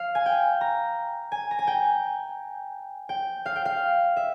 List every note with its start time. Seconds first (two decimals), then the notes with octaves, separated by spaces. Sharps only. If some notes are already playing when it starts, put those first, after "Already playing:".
Already playing: F5
0.15 G#5
0.26 G5
0.61 A#5
1.32 G#5
1.51 A#5
1.59 G#5
1.67 G5
3.09 G5
3.46 F5
3.56 G5
3.65 F5
4.17 E5